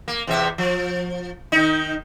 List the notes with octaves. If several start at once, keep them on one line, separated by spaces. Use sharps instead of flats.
A#3
E2 C3 E5
F3
D#3 D#4